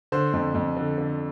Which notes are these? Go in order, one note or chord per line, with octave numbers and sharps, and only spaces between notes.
D3 C5
F2
F2
D3
D3